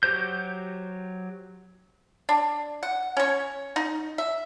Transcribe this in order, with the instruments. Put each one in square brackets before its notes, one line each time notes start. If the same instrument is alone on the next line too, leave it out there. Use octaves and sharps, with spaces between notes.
[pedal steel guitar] F#3 F#4 G4 C5 G6
[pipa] D4
F#5
C#4 C#5
D#4
E5